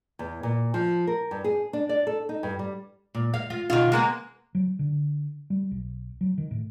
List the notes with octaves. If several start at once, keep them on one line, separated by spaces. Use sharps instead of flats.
E2
A#2
F3
A#4
G2
G#4
D4
D5
A4
D#4
G2
G3
A#2
F5
F4
B2 D#3 F4
G#3 A#3 B3
F#3
D3
G3
B1
F#3
D#3
A2